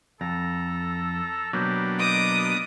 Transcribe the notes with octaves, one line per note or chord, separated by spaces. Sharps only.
F2 A4 A#5
B2 F#3 A#3 B3 D4 G4
D#5 D6 D#6